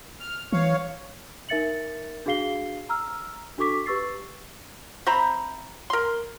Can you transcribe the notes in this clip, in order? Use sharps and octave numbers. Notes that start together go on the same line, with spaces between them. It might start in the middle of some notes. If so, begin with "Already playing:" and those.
F6
E3 C#5 F5
D#4 A#4 E5 A6 C#7 F#7
D4 F#4 G#4 F5 C7 G7
A#5 E6 F6
D4 F#4 A4 C#6 D6 B6
G4 B4 C#6 E6 A6 C7
C4 E5 A#5 B5
A#4 C6